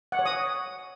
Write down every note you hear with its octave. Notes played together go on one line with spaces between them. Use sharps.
F#5
C#5
D#6